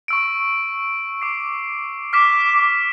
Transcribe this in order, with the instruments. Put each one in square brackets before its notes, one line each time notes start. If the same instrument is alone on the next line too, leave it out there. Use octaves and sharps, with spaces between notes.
[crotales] C#6 E6 D7
D6 C7
[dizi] D6 [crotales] F6 B6 E7